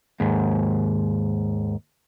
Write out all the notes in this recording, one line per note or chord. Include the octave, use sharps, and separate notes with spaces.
D#2 G#2